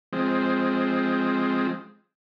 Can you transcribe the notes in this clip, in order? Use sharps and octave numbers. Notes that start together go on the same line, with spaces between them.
F3 G#3 C4